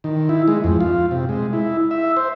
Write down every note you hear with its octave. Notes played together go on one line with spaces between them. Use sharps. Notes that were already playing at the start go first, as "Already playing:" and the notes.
D#3
E4
G#3
F2
F4
C3
G#3
E4
E5
C5